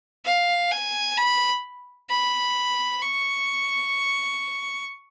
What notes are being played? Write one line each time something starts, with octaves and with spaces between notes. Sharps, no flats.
F5
G#5
B5
B5
C#6